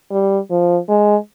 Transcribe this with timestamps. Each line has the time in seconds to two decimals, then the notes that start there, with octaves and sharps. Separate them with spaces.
0.11 G3
0.50 F3
0.89 G#3